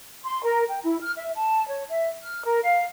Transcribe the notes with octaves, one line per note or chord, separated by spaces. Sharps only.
C6
A#4
G5
E4
F6
E5
A5
C#5
E5
F6
A#4
F5